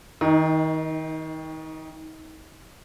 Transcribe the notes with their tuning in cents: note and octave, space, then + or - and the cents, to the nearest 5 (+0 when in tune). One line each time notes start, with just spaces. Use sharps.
D#3 +30 D#4 +0